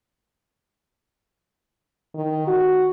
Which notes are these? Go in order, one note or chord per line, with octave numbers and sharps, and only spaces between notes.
D#3
F#4